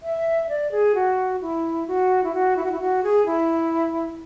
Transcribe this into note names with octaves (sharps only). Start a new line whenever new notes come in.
E5
D5
G#4
F#4
E4
F#4
E4
F#4
E4
F#4
E4
F#4
G#4
E4